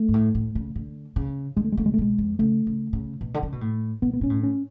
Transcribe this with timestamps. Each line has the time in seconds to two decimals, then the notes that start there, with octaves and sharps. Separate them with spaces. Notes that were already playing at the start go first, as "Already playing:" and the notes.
Already playing: A3
0.09 G#2
0.14 A2
0.35 A2
0.55 C#3
0.76 D3
1.16 C#3
1.57 D3 G#3
1.64 A3
1.72 G#3
1.77 C#3 A3
1.86 G#3
1.94 A3
1.98 B2 G#3
2.18 F2
2.39 C#3 A3
2.67 C#3
2.93 C#3
3.21 B2
3.34 D3
3.43 C#3
3.52 B2
3.61 A2
4.02 B2 B3
4.13 B3
4.21 B2 C#4
4.30 A2
4.43 C#4